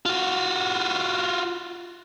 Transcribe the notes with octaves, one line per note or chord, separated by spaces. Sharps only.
F4 F#4